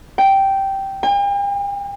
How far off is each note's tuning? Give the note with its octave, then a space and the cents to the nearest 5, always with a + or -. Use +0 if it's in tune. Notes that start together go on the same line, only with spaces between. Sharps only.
G5 -10
G5 +45